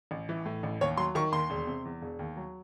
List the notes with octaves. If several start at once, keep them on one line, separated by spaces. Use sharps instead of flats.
A1
E3
A2
A1
D#2 C#5
F#3 C6
D#3 C#6
D#2 C6
E1
C3
E2
E1
D#2
F#3